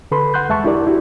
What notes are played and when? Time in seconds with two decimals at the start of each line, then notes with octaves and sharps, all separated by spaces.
0.11 D3 A4 B4 B5 C6
0.34 F#5 C6 F#6 G6
0.49 E2 G#3 E5 A5 C#6
0.64 D4 E4 G4 A#4 D5
0.87 E4 F#4 G4